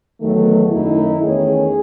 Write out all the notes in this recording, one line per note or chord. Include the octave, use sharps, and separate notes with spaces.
E2 D#3 F#3 A3
F#2 D#3 A3 D#4 E4
E2 D#3 A3 C#4 G#4